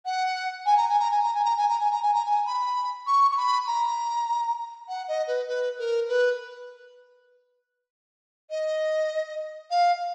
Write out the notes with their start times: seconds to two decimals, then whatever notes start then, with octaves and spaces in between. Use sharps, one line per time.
0.05 F#5
0.66 G#5
0.77 A#5
0.88 G#5
0.99 A#5
1.11 G#5
1.23 A#5
1.34 G#5
1.45 A#5
1.57 G#5
1.69 A#5
1.80 G#5
1.91 A#5
2.02 G#5
2.14 A#5
2.25 G#5
2.46 B5
3.07 C#6
3.31 C#6
3.37 B5
3.67 A#5
4.88 F#5
5.08 D#5
5.27 B4
5.47 B4
5.78 A#4
6.08 B4
8.50 D#5
9.70 F5